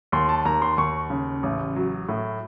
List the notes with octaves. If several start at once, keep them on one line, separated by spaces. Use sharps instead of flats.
D#2 C6
A5
D#2 A#5
C6
D#2 C#6
C#3
A1
F#3
A2